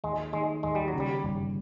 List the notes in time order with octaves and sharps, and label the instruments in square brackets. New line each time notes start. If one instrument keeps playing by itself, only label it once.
[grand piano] D#2 [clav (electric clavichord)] G#3
[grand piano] D#3 [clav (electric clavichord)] G#3
[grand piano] D#2 [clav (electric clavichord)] G#3
[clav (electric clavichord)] G3
F#3
[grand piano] C#3
[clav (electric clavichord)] G3
[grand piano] G1